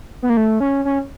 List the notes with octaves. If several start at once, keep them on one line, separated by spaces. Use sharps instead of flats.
B3
A#3
A3
C#4
C#4